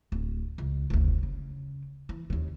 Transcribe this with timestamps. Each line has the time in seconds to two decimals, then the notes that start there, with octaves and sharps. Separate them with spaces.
0.12 D1
0.58 C#2
0.90 F1 D2
1.23 C#3
2.09 E3
2.30 D#2 C#3